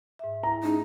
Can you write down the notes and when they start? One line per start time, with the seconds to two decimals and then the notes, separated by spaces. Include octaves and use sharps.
0.19 G#2 E5
0.43 E4 A#5
0.63 A3 C#4 D#4 G#4